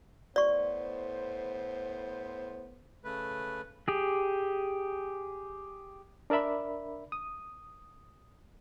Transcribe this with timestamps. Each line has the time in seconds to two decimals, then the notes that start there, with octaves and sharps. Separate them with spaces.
0.36 A2 B3 C5 D5 C#6
3.04 C#3 A3 B4
3.88 G4 G#4
6.30 D4 A#4 D5 E5 B5
7.12 D#6